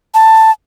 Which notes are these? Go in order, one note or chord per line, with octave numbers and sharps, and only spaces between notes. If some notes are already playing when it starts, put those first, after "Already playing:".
A5